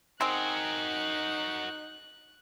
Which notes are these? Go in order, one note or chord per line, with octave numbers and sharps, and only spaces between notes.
C4 D#4 F#4 G#4 A#4 F#6